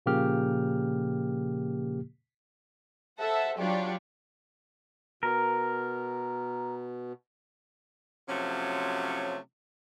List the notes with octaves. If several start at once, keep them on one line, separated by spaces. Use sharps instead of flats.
A#2 C#3 F3 A#3 G4 F6
A4 C5 E5 F#5 A5
F#3 D4 F4 G4 C#5 D5
B2 A#4
C3 F3 F#3 A3 C#4